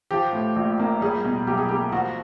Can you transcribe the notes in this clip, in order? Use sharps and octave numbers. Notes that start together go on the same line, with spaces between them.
F3 G4
A2
A#1
A#3
G3 G#4
B2
B1 G4
G#4
A#3 G4
F3 F#4